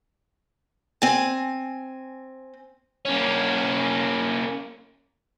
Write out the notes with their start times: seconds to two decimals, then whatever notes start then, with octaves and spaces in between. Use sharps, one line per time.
1.02 C4 G#5
3.05 A#3 C#4